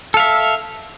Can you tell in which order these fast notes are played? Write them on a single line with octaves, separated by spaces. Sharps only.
A4 F5 E5